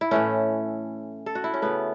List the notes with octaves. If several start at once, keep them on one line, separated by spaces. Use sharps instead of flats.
E4
A2 E3 A3 C#4
A4
F#4
E4
C#4
C#3 A3 B3